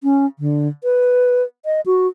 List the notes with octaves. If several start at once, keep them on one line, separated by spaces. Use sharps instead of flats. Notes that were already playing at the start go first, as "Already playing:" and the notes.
C#4
D3
B4
D#5
F#4